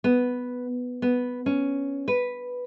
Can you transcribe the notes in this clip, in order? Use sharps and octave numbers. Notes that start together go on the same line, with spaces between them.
B3
B3
C#4
B4